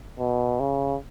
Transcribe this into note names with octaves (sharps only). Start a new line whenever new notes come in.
B2
C#3